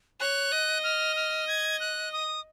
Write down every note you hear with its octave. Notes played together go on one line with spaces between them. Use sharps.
C#5 F#6
D#5
F6
F6
G#6
F#6
D#6